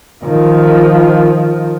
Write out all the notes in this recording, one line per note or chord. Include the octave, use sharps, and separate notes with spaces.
D#3 F3